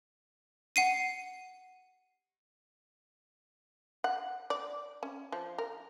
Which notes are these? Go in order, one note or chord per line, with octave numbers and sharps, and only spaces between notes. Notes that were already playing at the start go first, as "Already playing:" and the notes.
F#5 C7 D#7
F#5
D5
C#4
F3
A#4